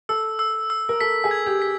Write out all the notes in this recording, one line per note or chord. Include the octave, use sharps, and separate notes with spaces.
A4 E6
E6
E6
A#4
A4 B6
G#4
G#6
G4
B6